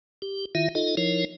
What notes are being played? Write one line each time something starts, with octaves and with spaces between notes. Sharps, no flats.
G4
D#3 E4 F4 E5
D#4 F4 A4 D#5
F3 D#4 E4 A#4 C#5